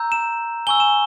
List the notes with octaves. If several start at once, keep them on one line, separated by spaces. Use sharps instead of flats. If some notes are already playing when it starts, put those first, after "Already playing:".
Already playing: A#5 E6 G6
E7
G#5 C#6 E6 G7
E7